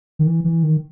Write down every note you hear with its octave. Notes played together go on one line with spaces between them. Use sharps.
D#3
E3
E3
D#3